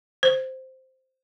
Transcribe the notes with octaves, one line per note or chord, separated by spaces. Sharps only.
C5